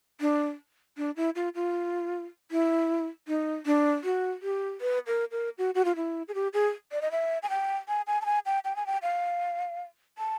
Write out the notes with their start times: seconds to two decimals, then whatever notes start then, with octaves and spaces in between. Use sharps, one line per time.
0.20 D4
0.97 D4
1.17 E4
1.36 F4
1.55 F4
2.51 E4
3.28 D#4
3.66 D4
4.04 F#4
4.42 G4
4.81 B4
5.07 A#4
5.32 A#4
5.58 F#4
5.75 F#4
5.85 F4
5.96 E4
6.28 G#4
6.35 G4
6.53 G#4
6.92 D5
7.02 D#5
7.11 E5
7.43 G#5
7.50 G5
7.88 G#5
8.07 G#5
8.22 A5
8.26 G#5
8.46 G5
8.65 G5
8.76 G#5
8.87 G5
9.03 F5
10.18 A5